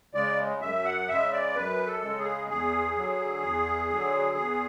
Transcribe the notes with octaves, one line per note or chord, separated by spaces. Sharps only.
C#3 G#3 D5
F#2 E5
F#5
C#3 G#3 E5
D5
F#2 B4
A4
C#3 G#3
G#4
E2 G#4
D3 F#3
E2
D3 F#3
E2